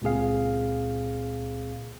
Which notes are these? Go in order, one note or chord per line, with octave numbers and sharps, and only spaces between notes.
C#2 A#2 C4 G#4 F5